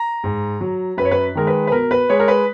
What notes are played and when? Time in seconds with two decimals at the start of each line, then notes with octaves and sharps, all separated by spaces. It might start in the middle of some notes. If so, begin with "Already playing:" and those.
Already playing: A#5
0.24 G#2
0.61 F#3
0.97 F#2 B4
1.05 C#5
1.11 B4
1.35 D#3 G#3 A#4
1.47 B4
1.67 B4
1.72 B2 A#4
1.91 B4
2.09 G#3 C#5
2.20 A#4
2.28 B4